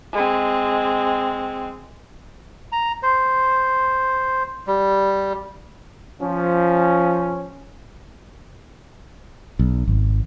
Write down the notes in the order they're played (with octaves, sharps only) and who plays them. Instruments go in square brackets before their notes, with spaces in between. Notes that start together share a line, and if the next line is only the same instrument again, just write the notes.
[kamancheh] G#3 C4
[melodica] A#5
C5
G3
[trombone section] F3 C#4
[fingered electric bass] B1
G#1